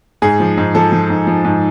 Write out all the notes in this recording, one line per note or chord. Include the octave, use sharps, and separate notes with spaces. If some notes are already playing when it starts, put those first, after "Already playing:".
G#2 G#4
F3
G#2
F3 A4
F3
G#2
F3
G#2